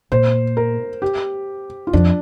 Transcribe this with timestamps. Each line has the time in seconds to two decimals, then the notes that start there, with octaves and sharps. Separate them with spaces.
0.12 A#2 C5
0.57 A#4
1.02 G4
1.87 F4
1.93 F2 D4